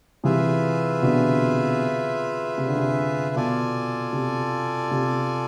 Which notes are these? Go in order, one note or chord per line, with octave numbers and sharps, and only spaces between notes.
C3 E3 F4 G#4 B4 E5
B2 D3
C3
D3
C3
B2 F4 A4 D5 G#5
C3
C3